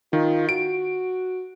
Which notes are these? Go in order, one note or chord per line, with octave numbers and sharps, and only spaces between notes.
D#3 F4
F#4 D7